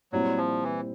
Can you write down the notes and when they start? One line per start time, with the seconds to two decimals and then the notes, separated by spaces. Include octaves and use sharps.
0.12 A#2 F#3 G3 C4 E4
0.37 F3
0.64 E3